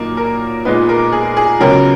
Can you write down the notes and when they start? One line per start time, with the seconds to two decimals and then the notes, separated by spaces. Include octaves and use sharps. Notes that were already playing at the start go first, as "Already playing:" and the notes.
Already playing: A#2 F#3 A#3 D#4
0.17 A#4
0.65 A#2 G#3 B3 D#4 B4
0.89 A#4
1.13 G#4
1.37 G#4
1.60 C#2 C#3 F#3 B3 A#4